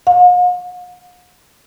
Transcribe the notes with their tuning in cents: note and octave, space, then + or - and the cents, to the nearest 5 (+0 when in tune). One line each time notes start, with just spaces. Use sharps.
F5 +45